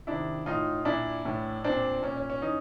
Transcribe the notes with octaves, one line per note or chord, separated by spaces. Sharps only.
C3 D#3 D4 E4
A2 E3 D#4 F4
A#2 D4 E4
A2 E3
A#2 C4 D4
A#2 C#4
C#4
C#4
E3 C#4 D#4